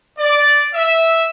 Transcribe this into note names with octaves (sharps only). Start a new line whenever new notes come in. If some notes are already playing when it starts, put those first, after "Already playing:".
D5
E5